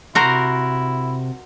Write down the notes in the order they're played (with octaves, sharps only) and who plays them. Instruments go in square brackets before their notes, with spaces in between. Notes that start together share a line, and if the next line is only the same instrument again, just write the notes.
[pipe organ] C3 [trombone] E4 [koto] F#4 A#4 C5